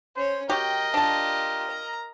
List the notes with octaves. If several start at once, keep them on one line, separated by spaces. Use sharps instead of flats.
C#4 C5 C#5
F#4 G4 A#4 D#5 G5
D4 F4 G4 A5
A#5